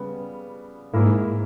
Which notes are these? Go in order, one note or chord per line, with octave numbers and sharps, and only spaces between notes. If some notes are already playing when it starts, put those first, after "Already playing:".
Already playing: C#3 G3 B3
G#2 A#3 E4 A#4